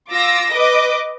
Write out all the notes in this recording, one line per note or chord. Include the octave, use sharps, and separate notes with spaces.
F4 D6 E6 A#6
B4 D#5 D6